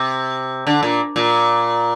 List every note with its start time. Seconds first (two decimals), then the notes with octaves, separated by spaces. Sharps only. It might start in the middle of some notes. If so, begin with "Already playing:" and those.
Already playing: C3
0.67 D3
0.83 A#2
1.16 A#2